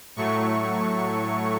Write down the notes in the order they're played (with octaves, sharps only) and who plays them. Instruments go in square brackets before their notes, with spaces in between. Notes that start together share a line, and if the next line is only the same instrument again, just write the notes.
[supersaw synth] A2 F#3 A3 C#6